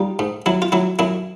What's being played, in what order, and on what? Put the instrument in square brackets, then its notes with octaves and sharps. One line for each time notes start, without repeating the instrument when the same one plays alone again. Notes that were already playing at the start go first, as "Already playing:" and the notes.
Already playing: [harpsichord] G3 D#4 F4
G#2
F#3 E4
F4
F#3 E4
F#2 E4